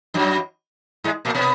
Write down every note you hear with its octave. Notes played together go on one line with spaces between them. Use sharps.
F#2 F#3
G#2 G#3
A#2 A#3
B2 B3